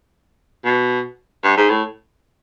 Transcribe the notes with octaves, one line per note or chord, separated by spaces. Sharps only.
B2
G2
G#2
A2